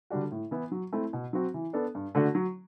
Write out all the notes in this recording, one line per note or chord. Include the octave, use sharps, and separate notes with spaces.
D3 G3 D4 F#4
A2
E3 B3 E4
F#3
A3 C4 E4
B2
F#3 C4 F#4
E3
B3 D4 A4
G2
D3 A3 D4 F#4
F#3